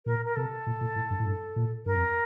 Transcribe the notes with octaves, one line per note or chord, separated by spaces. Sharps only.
A#2 A#4
A#4
C3 A4
A#2
A#2
A2
G2
A2
G2
A#2
G2 A#4
F2